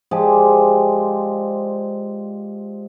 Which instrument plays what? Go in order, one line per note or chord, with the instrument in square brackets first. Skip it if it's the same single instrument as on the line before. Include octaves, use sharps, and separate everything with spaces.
[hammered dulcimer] F3 G#3 G4 D5